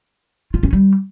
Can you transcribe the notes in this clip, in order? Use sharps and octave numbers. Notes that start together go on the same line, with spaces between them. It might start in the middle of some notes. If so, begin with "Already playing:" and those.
F4
C#4
G3